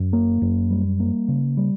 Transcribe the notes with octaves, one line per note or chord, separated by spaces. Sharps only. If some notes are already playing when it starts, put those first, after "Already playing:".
Already playing: F#2
A#3
F#2
G3
A#3
C#3
G3